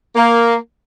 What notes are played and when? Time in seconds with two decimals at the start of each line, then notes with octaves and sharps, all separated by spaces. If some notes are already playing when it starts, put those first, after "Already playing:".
0.16 A#3